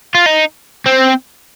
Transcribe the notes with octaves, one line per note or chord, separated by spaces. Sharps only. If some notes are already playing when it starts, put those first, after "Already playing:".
F4
D#4
C4